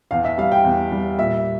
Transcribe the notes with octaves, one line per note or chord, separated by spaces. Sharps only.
E2 F5
E5
G3 F5
G5
E2
G3
A#2 E5